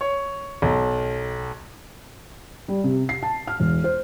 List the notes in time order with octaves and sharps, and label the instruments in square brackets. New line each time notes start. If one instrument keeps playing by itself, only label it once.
[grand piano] C#5
B1
[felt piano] G3
C3
C7
A5
F6
E1
C5